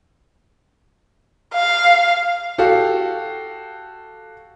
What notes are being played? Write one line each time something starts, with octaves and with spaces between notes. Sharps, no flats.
F5
F#4 G4 A4 F5